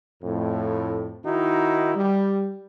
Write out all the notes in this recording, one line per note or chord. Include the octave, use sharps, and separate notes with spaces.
F2 A2
D#3 D#4 E4 F#4
G3